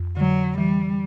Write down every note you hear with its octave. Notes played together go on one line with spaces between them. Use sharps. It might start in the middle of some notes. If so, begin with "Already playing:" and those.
Already playing: F2
D3 F#3
E3 G3